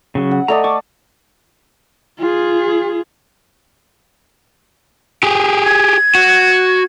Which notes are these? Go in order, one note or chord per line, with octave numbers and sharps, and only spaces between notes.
C#3 F#3
F#5
A3 D5 D#5 A#5
A5 C#6 D6
F4 G#4
G4 G#4
G#6
F#4